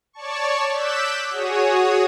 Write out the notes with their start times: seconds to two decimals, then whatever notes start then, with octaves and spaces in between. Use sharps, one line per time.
0.13 C#5 D5 A5 C#6
0.72 D6 E6 F#6 G6 B6 E7
1.30 F#4 G#4 C#5 D#6